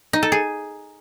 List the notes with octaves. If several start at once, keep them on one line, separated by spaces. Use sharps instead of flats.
D#4
A4
G#4